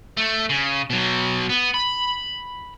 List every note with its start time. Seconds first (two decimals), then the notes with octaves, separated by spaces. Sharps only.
0.17 A3
0.50 C#3
0.90 B2 F#3
1.49 B3
1.74 B5